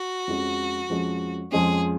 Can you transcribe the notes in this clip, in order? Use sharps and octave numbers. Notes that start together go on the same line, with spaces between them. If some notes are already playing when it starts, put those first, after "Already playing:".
Already playing: F#4
F2 F3 G#3 C#4
F2 F3 G#3 C#4
F2 F3 G#3 C#4 G#4